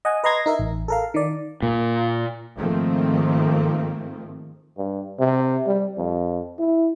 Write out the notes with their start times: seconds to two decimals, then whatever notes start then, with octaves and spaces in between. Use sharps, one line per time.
0.05 D#5 F#5 G#5
0.24 B4 D#5 A#5 C6 G#6 A#6
0.46 D#4 A#4 E5
0.59 A1
0.88 A4 A#4 F5
1.14 D#3 D5
1.62 A#2
2.56 G#2 D#3 F3 A3 A#3 C4
4.78 G2
5.19 C3
5.67 G3
5.98 F2
6.59 E4